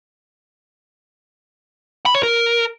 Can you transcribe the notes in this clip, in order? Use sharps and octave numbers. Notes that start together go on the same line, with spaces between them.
B5
C#5
A#4